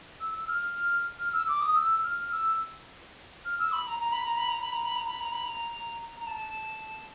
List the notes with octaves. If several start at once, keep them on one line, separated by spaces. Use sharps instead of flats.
E6
E6
F6
F6
E6
D6
D#6
E6
F6
E6
F6
E6
B5
A#5
A#5
B5
A#5
B5
A#5
B5
A#5
B5
A#5
B5
A#5
B5
A#5
A#5
A5